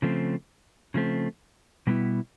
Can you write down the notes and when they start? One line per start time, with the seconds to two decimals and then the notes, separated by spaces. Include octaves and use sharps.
0.02 C#3 F3 A3 C4
0.94 C#3 F3 A3 C4
1.87 B2 G3 B3 E4